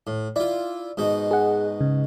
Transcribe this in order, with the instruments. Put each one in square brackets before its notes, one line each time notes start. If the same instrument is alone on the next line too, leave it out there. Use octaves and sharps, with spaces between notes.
[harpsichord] A2
[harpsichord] E4 F4 [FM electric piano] D5
[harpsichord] G#2 B2 D#4
[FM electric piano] G#4 F#5
C#3